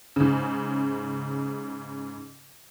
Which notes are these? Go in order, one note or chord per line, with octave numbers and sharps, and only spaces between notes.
G#2 C#3